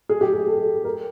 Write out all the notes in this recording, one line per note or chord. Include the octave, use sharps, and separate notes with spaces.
G#4
G4
G#4
A4
A#4